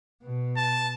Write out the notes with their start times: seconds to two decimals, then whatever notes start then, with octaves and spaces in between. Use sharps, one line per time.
0.23 B2
0.57 A5